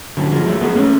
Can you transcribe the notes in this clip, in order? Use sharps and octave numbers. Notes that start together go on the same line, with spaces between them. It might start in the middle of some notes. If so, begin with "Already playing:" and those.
D3 F#3
F3 G#3
F#3 A3
G#3 B3
A3 C#4